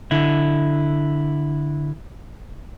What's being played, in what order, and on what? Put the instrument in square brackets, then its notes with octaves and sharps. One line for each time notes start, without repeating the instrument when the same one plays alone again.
[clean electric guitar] D3 E4